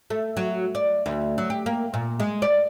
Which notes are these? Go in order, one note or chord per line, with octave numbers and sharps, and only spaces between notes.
A3
F#3
D5
D2
F#3
G4
A#3
A#2
G#3
D5